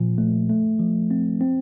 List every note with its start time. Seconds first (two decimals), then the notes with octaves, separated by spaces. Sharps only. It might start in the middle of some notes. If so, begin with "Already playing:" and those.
Already playing: A#2 F3
0.18 A3
0.50 A3
0.79 F3
1.11 C4
1.41 C4